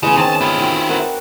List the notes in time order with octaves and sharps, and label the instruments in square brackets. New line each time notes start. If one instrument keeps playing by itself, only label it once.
[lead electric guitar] C#3 [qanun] E3 B3 C#4 [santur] G#3
[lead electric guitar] E2 A5 [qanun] D#3 [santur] C4 C#5
[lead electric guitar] E4 F4 [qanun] A4 B4
[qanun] D#3 F#4 A#5
[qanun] C4 D4 B4 [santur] A#4 F#5